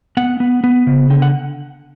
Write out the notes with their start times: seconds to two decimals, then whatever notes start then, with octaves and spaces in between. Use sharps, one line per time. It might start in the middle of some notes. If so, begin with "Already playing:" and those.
0.17 B3 F#5
0.40 B3
0.64 B3
0.87 C#3
1.10 D3 G5
1.22 F#5